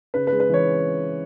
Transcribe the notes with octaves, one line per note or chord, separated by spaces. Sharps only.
C#3 B4
B4
G#3
B4
E3 C#5